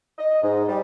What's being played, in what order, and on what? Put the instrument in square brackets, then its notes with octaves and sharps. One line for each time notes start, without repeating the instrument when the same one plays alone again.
[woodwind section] D#5
G#2
G3